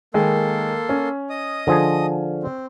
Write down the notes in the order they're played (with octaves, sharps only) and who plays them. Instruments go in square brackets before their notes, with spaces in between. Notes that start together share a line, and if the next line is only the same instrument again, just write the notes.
[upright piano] D#3 G#3 [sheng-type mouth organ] A#3 A4 C6
[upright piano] C#4
[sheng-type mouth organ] D#5 D#6
[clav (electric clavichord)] D3 F3 G#4
[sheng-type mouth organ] C4